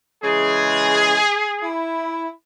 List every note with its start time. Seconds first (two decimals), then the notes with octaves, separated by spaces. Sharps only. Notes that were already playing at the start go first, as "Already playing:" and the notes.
0.24 C#3 E3 G#3 G#4
1.62 E4